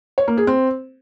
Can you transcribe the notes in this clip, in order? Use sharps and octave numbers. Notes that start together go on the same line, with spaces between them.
C#5
A#3
G#4
C4